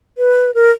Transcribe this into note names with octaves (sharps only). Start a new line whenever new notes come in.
B4
A#4